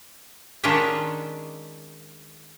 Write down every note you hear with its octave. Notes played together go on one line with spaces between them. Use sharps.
D#3 G#3 C#4 D4 F4 E5